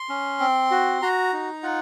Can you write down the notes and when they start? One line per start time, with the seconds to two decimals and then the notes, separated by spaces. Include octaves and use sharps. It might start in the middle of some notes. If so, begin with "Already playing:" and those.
Already playing: C6
0.09 C#4
0.40 C4
0.71 F#4
1.02 F#4 A#5
1.33 D#4
1.63 F4 F#5